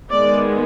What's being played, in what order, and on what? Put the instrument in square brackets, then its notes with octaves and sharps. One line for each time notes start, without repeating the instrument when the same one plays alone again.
[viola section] D#3 G#3 B3 D5